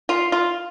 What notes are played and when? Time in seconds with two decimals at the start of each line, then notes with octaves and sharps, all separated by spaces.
0.09 F4
0.32 F4